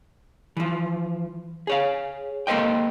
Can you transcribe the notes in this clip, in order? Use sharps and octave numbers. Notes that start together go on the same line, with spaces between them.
E3 F3
G#4 C#5 F5
A#3 A4 C5 D#5 G5